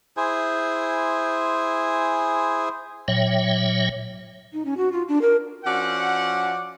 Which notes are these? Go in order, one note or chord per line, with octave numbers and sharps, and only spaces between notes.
E4 G#4 C5 G#5
A#2 F#3 C#5 E5 G5
D#4
C#4
F#4
F4
D4
A#4
F3 C#4 F#4 D5 F#5